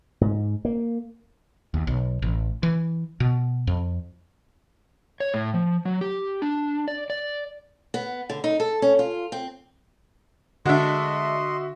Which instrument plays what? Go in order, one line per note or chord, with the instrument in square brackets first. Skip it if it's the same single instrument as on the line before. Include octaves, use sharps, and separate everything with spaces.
[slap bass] G#2
A#3
[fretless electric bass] D#2
B1
A1
E3
B2
F2
[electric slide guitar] C#5
A2
F3
F#3
G4
D4
D5
D5
[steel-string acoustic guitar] B3
D3
D#4
A4
C#4
F4
C4
[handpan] D3 F#5 [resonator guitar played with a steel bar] G#3 D4 [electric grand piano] F#4 E5 [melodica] D#5 C6